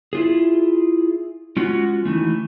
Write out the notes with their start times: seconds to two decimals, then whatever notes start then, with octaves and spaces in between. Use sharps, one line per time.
0.13 E4 F4 G#4
1.57 G#3 C#4 F4 F#4
2.05 D#3 E3 A3